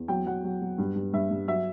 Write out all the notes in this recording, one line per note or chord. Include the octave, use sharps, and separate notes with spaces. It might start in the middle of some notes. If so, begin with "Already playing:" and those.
Already playing: E2
F#3 G5
F#3 F#5
F#3
F#3
G2
G2
G2 E5
G2
F#3 E5